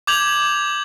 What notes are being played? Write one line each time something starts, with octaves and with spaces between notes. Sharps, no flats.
D6 G6 G#6 F7 F#7